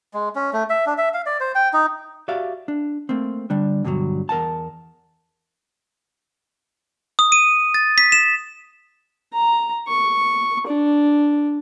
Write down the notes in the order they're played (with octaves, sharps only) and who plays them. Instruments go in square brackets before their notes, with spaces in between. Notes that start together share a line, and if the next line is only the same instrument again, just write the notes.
[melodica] G#3
C#4
A3
E5
D4
E5
F5
D5
C5
G5
D#4
[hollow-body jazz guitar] F#4 G4 D5 E5 F5
D4
A3 A#3 C4
D3 G3 D4
G2 B2 D3 F3 F#3
E2 A#4 F#5 A5
[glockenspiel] D#6
D#7
A6
B6
E7
[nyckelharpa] A#5
C#6
D4